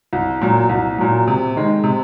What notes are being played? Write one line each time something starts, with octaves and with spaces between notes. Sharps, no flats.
C2
A#2 F#3
C2
A#2 F#3
C3
D#3 G#3
C3